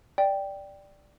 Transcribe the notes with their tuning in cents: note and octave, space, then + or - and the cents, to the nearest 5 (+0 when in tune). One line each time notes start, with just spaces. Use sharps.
D5 +0 G5 +0